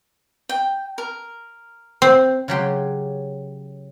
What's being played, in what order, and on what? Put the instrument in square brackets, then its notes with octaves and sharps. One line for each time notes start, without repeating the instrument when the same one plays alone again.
[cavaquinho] G5
A#4
[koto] C4
[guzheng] C#3 F#3 G4 C6